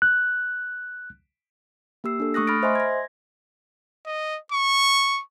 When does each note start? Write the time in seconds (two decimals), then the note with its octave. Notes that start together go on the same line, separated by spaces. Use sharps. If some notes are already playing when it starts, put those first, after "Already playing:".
0.02 F#6
2.04 A#3 G4 E6 C7
2.20 D4 A4
2.34 A3 C#6 D#6 F#6 A#6
2.47 B5 F6 A6 A#6 D7
2.63 C5 D#5 E5 G#5 C6
2.75 G#6 A#6
4.06 D#5
4.52 C#6